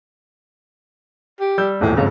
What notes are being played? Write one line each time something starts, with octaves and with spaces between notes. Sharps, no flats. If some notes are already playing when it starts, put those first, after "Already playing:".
G4
G3 E6 G6
D#1 E2 A2
F#1 F2 G#2 C#3